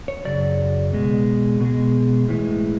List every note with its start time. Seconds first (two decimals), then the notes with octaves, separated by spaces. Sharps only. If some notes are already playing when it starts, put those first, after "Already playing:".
0.08 C#5
0.25 F#2 C#3 F#3 D5
0.93 B2 G#3
1.61 B2 G#3
2.28 A2 E3 G#3